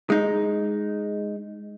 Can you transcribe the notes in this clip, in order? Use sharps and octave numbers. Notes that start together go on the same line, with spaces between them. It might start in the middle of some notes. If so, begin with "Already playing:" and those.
G#3 D#4